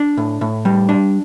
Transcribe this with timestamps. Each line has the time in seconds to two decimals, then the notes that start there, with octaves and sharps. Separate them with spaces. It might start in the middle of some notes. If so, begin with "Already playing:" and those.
Already playing: D4
0.17 A2
0.41 A2
0.65 G3
0.89 D4